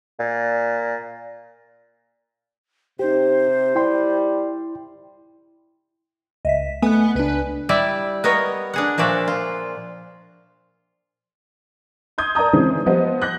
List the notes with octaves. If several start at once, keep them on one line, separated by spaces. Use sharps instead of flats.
A#2
C3 D#4 G4 C5
G3 E4 G5 C6
C#2 D#5 E5 B6
A3 B3 G#5 F#6
C#2 D4 B4
G3 E4 D5 E5
B3 A#4 C#5 D#5
D4 G#4 F#5
A#2 F3 F#4 D5 E5
F4
C6 D#6 G6 G#6
A#4 D5 A5 A#5 D#6
D#3 E3 G#3 C4 C#4
F3 G3 B3 C5 D#5
F#6 G6 A#6